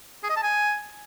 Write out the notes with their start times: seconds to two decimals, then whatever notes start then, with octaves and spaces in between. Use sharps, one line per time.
0.23 G#4
0.30 D#5
0.36 A5
0.43 G#5